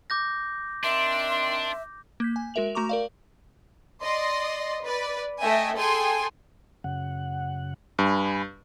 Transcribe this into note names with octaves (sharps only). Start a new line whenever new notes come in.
D6 G6 A#6
D#3 C4 D4 E5 C6
A#3 G6 B6
G#5
G#3 F#4 A#4 E5 F7 F#7
A3 F#4 A#5 C#6 D6 F7
A#4 D5 F5
D5 D#5 C6
B4 D5
A3 D#5 E5 G5 G#5
G#4 A4 G5 G#5 C6
F#2 C#3 F#5
G2 G#5 B5